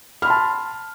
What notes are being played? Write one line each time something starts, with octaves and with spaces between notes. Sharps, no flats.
A5 B5 C6 F6